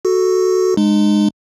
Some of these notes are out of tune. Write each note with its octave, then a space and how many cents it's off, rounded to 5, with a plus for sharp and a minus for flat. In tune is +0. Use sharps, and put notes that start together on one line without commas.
F#4 +0 A4 +0
G#3 -5 D#4 -40